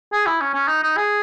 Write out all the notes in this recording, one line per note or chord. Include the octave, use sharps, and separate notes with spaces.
G#4
E4
C#4
C#4
D#4
D#4
G#4